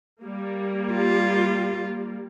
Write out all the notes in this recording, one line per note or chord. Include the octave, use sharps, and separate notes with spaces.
G3 A#3
F4